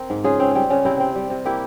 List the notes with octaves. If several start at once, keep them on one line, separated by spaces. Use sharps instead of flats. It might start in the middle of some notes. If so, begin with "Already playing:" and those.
Already playing: C4 A#4
G#2
C#3 F4 G#4
C4 C#4
G3 C4
C#3 C#4
C3 C4 E4
C4
G3
C3
A#3 E4 G4